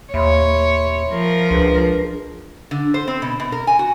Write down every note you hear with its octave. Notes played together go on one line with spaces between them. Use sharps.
D#2 C#5 E5 B5 C6
F3 A#4
C#2 D4 G#4 B4
D3
C5
C4
B2
B2
A#4
G#5
F#4